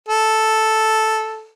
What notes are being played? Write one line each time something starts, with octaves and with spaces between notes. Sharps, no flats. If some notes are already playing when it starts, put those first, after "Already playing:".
A4